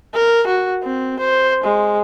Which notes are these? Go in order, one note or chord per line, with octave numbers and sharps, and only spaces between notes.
A#4
F#4
C4
C5
G#3